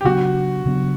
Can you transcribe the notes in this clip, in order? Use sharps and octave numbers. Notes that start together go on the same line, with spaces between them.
G4
C#3 F#3 B3 D4 F#4
C#3 F#3 B3 D4